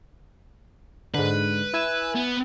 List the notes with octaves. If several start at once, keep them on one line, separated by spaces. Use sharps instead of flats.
G#2 D3 B4
E4 G#5 E6
B3